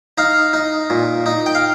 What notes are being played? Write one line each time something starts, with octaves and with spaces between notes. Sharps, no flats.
D#4 F5
D#4
A#2
D#4
G5
F5